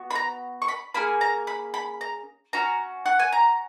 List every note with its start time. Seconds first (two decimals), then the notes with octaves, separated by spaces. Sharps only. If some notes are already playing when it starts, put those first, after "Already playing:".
Already playing: B3 F#4
0.10 B5
0.15 A#5
0.62 C#6
0.68 B5
0.94 A#3 C#4 G#4 B5
1.21 A#5
1.47 B5
1.74 B5
2.01 A#5
2.53 C#4 F#4 A#5
3.06 F#5
3.19 G#5
3.32 A#5